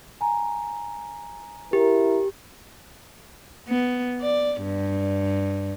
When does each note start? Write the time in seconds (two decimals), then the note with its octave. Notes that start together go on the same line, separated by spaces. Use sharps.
0.21 G#5 A#5
1.73 E4 G4 A#4
3.67 B3
4.21 D5
4.63 G2